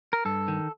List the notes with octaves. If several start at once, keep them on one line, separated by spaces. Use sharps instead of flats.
A#4
G2 A4
D#3